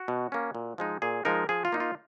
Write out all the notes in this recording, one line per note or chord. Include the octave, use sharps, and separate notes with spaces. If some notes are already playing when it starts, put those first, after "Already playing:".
Already playing: F#4
B2
A#3 C#4
A#2
F3 G#3 D#4
A#2 G#4
F3 G#3 D#4 A#4
F3 G#4
F4
A#3 D#4
F4